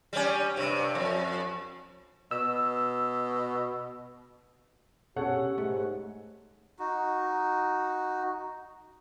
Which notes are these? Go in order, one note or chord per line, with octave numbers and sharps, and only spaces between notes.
G3 C#4
G2 C3
F2
B2 E6
B2 C#4 G4 A4 C#5 F#5
G#2 A3
D#4 F#4